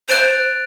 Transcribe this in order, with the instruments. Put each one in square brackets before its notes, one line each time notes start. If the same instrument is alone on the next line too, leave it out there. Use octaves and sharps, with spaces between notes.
[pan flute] C5 [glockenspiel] F#6 A6 D7 F7